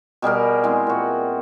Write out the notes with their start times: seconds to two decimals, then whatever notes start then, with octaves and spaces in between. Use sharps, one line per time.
0.22 B2 G3 G#4 A#4
0.64 E3 G#3 C4
0.87 A#2 F#4